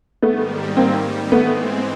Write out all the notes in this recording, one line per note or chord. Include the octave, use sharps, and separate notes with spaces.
G#2 D#3 G3 A3 B3
A#3 C4
G#2 E3 G#3 A3 B3 C4